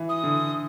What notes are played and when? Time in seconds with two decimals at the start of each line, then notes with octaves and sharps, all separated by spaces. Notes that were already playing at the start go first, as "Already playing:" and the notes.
Already playing: E3
0.09 D#6
0.24 D3